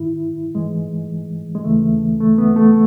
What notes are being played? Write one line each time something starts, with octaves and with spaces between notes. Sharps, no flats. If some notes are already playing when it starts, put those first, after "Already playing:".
Already playing: G#2 D#3 E4
G#2 E3 G#3
G#3
D#2 C#3 E3 A3
A3
B3
A3